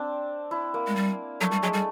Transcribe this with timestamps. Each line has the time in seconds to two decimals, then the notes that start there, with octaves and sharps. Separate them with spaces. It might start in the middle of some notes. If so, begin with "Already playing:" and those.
Already playing: C4 D4
0.51 E4
0.74 A#3
0.87 G#3
0.96 G3
1.41 F#3 A3
1.51 G3 A3
1.63 F#3 G#3
1.73 G3 A3